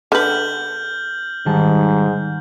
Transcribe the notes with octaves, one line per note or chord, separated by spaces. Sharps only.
D3 B4 F6 G6 F#7
G#2 D#3 G3 A5